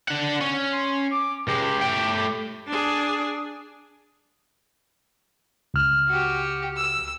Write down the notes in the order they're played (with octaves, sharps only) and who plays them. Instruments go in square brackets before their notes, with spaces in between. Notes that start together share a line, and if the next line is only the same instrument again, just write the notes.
[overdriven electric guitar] D4 F#5
C#4
[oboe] C6
D6
[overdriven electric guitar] C#2 G#3 [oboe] G4
[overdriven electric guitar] A3 G5
[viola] D4 G#4
[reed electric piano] C#2 F6
[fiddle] F#4 G4
E6